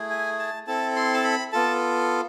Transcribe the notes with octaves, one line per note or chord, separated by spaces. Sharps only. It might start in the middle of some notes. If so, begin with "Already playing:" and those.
Already playing: A3 E4 G#4
G#5
A5
C4 E4 A4 A5
C6
A5
B5
B3 F4 A4 A5